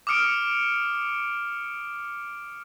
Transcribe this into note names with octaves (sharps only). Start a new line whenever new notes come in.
D6 D#6 F6 C#7 D7